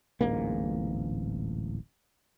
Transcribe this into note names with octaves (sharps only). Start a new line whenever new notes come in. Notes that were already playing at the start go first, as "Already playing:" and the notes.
D1 A1 G#2 A#3